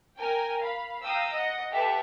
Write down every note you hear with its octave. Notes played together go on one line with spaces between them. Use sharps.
A#4 G5 G#5
F5 B5
F5 G5 A#5 D#6 E6
D#5 F#5
G4 A4 B4 E5 F#5